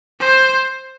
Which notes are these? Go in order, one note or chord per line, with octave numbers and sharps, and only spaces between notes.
C5